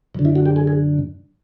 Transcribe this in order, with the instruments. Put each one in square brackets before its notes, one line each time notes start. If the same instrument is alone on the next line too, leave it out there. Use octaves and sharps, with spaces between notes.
[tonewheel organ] F#2 D3
E4
F#4
G4
G#4
G#4